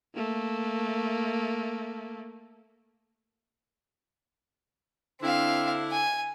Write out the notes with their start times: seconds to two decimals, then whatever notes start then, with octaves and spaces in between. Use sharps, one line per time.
0.15 A3 A#3
5.21 D3 C4 D4 E4 F5
5.91 G#5